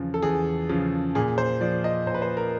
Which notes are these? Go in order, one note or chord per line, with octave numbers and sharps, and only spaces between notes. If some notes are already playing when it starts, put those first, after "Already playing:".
Already playing: E2 C#3 F3
A4
E2 G#4
C#3 F3
A#2 G#4
C5
F3 D5
D#5
A#2 C5
B4
C5
A#4